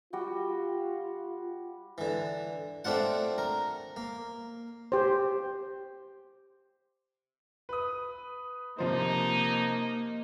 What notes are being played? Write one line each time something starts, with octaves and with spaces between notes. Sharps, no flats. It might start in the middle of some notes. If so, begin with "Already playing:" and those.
G3 F4 F#4 G5
D3 E3
A3 C4 D4 F4 F#5
A#4
A#3
G4 C5
B4 D#6
C3 F3 A#3 D#4 C5